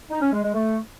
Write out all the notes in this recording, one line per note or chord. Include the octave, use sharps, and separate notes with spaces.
D#4
C#4
G#3
G#3
A3